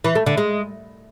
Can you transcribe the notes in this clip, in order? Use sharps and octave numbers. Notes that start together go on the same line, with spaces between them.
E3
A3
D3
G#3